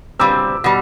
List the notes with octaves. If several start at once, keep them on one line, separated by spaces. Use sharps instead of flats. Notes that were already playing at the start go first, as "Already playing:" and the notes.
A#2 G3 C4 D6 E6
B2 G3